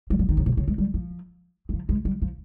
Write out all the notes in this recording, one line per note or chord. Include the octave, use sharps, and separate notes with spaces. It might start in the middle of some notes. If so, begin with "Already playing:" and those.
G3
F3
D#3
C#3
C3
C#3
G#3
G3
F3
D#3
F3
G#3
G3
F3